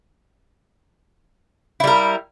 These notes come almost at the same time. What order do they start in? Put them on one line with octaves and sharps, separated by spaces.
E4 G3 A#4